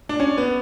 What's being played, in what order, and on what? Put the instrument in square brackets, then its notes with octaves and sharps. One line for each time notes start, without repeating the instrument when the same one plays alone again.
[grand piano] D4
C#4
B3